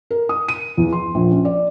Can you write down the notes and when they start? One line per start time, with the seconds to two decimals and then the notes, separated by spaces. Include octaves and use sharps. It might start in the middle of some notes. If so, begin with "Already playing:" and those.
0.10 A#4
0.29 D#6
0.48 D#7
0.77 E2
0.93 C6
1.15 A#1
1.31 C#4
1.45 D5